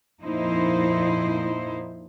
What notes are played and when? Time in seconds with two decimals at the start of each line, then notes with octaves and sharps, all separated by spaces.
0.22 F2 A#2 F3 D#4 E4 C5